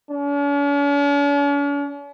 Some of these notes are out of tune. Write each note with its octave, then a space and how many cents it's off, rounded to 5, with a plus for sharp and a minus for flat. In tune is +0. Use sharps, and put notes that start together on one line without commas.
C#4 +45